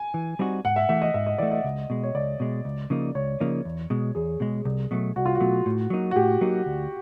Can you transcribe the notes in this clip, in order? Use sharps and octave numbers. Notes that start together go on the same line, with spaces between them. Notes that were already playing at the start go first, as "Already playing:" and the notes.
Already playing: G#5
E3
G3 C4 D#4 F#4
G#2 F#5
E5
E3 A3 E5
D#5
G#2 E5
D#5
E3 A3 D5
D#5
C#2
B2 G#3
C#5
C#2 D5
B2 G#3
C#2
C#3 F3 A#3 D#4
C#2 C#5
C#3 F3 A#3 D#4
E2
B2 G#3
E2 G#4
B2 G#3
C2
B2 F#3 A3
C2 F#4
F4
F#4
B2 F#3 A3
A2
F#3 A#3 D#4
F#4
A2 G4
F#3 A#3 D#4
D2